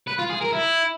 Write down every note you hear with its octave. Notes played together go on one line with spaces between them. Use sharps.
B4
F4
G#4
A#4
E4